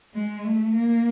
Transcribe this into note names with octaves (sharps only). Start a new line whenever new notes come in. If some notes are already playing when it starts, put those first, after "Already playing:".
G#3
A3
A#3